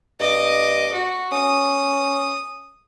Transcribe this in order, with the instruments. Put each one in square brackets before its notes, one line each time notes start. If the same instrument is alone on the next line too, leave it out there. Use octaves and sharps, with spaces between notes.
[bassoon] G2 [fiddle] D#5 D6
[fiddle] F#4
[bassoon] C#4 [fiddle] D#6